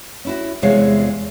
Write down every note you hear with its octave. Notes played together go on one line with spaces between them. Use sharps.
C#4 E4 F#4
E2 C3 G#3 C#5 F5